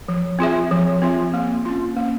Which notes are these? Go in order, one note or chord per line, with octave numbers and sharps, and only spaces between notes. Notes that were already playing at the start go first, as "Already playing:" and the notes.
F3
C4 F4 G#4 E5
F3
C4 F4 G#4 E5
A#3
C#4 F4
A#3